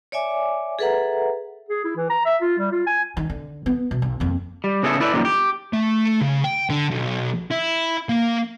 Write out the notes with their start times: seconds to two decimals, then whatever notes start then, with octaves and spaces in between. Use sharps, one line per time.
0.12 C#5 D5 E5 G#5 D6
0.79 G#4 A4 B4 E5 F#5 A#5
1.69 G#4
1.84 E4
1.97 E3
2.10 A#5
2.25 E5
2.41 F4
2.58 G3
2.72 F4
2.87 G#5
3.17 D#3
3.30 D3
3.66 B3
3.91 B2
4.02 B1
4.20 F2 A#3
4.64 G3
4.83 C#3 B3 G#4 A4 E5
5.00 E4 A4 B4 D5 E5
5.13 F#2 A#2 D3 D#3 F3 G3
5.25 G4
5.73 A3
6.21 C#3
6.44 G5
6.70 D3
6.91 B1
7.51 E4
8.09 A#3